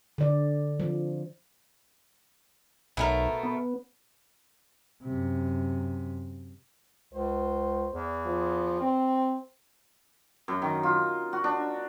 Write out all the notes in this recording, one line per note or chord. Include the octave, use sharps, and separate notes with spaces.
D3 D5
F3
B1 B2 A3 A#4
B3
F#2 C3
C#2 C5
E2
F3
C4
F#2
D#3
F4
F#4
D4